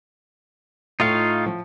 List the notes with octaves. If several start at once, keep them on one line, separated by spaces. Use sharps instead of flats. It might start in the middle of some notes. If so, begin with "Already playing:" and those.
A2 A3 D#4 F4 F5 C#7
F3